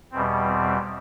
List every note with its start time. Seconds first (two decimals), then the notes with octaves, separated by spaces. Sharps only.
0.12 E2 B2 G3 C4
0.46 C4